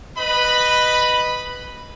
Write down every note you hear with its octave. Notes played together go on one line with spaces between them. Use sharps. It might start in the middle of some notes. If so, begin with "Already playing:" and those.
B4 D#5 B5